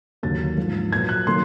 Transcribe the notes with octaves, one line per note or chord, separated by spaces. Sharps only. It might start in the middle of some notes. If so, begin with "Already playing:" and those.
D#2 D3 F#3 A#3 A6
G#2 F3 A#3
A#2 F#3 B3 G#6
F#6
D#3 F#3 A#3 C6